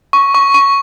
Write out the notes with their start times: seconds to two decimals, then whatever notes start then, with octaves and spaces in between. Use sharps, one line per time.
0.13 C#6
0.35 C#6
0.54 C#6